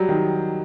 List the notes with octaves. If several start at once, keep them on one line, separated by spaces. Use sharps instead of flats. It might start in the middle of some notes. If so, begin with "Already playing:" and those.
Already playing: F#3 G3
D#3